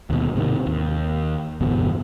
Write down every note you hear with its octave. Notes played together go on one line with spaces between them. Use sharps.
D#2 B2
G#2 C3 D#3
D#2
D1 G1 E2 B2